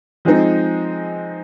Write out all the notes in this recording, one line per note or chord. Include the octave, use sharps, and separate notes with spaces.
F3 G#3 C4 D#4